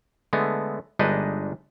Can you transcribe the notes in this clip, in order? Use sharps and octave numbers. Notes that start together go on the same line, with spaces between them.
D3 G#3 A3 B3
G1 G#3 D4 D#4 B4 D#5